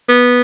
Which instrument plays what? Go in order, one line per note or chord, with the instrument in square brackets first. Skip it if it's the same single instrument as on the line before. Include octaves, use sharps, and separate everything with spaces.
[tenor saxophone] B3